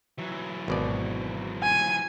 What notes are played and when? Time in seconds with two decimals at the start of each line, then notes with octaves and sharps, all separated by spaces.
0.18 E3 F#3
0.68 G#1 B2 D5
1.63 G#5